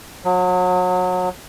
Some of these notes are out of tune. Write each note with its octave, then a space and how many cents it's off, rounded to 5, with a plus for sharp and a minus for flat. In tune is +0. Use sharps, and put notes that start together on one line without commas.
F#3 -30